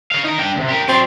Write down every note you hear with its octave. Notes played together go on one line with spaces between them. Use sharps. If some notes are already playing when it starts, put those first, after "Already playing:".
C#5 F5
D#4 A#4
D4 G5
D2 C3
G4 A#4
F#3 C4 D5